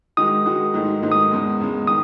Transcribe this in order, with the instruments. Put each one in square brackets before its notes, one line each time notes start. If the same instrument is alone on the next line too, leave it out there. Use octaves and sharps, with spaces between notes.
[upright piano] D#3 G#3 D#4 F#4 [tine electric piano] D#6
[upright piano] D#3 G#3 D#4 F#4
G#2 D#3 F#3 A3 D#4
G#2 D#3 F#3 A3 D#4
[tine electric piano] D#6
[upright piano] E2 C#3 G#3
E2 C#3 G#3
[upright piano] D#3 [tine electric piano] D#6